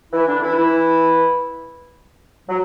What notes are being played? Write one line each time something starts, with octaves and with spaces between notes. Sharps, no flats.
E3 E4
D3 D4
E3 E4
E3 E4
F#3